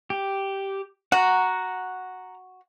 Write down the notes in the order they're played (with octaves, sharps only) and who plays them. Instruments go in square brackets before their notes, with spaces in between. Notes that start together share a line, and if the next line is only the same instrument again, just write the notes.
[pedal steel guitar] G4
[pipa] F#4 [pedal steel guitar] F#5 A#5